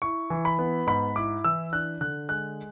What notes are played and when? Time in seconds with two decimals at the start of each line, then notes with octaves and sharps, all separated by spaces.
0.02 E4 C#6
0.30 E3
0.45 B5
0.59 B3
0.87 G#2 B5
1.16 E4 D6
1.44 E3 E6
1.73 D4 F#6
2.01 D3 F#6
2.29 G#3 F#6